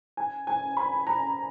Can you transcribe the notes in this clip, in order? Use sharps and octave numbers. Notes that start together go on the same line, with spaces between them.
G#5
G#5
B5
A#5